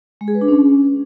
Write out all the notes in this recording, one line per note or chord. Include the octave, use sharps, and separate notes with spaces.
G#3
G#4
B4
D4
C#4